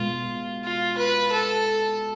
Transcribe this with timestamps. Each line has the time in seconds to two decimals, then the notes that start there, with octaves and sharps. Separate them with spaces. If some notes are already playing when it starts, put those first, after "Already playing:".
Already playing: B2 G#3 B3 F4
0.64 F4
0.98 B4
1.32 A4